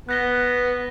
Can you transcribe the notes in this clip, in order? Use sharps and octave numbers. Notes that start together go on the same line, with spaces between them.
B3 F#6 A#6 G7